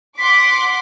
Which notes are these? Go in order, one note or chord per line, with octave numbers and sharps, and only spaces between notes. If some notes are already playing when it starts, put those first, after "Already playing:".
F#5 C6 D6 B6